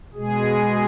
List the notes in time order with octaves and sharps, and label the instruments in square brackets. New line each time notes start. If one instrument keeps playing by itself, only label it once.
[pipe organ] B2 G#3 G#4